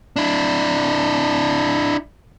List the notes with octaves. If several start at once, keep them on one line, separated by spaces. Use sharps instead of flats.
D4 E4